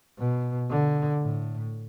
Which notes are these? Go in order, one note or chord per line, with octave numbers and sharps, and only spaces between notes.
B2
D3
A2